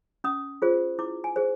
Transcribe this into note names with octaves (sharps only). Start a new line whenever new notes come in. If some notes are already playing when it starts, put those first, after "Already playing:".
C#4 D#6
F4 G#4 C5
E4 D6
G#5
G#4 C5